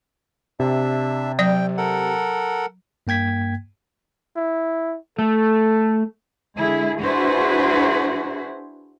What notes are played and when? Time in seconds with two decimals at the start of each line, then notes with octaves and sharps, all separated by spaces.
0.60 C3 D4 E5
1.39 F#3 D5 G5
1.78 A4 A#4 F#5
3.07 G2 A#3 G5 G#6 B6
4.36 E4
5.19 A3 A4
6.57 D3 G#3 E4 G#4
7.02 D4 E4 F#4 G#4 B4 C5